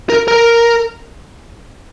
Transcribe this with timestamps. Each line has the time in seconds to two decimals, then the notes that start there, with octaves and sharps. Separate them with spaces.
0.10 A#4
0.28 A#4